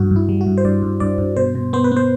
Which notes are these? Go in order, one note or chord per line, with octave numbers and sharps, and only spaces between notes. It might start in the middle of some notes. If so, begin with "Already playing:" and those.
Already playing: G2 F#4
G2 E4
G3
F#4
G2
C5
G2 D5
G2
G2 D5
G2
B2 C5
B2
B3 C5
B4
B3
C5